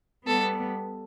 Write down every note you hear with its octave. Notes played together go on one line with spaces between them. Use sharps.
G3 B3 A4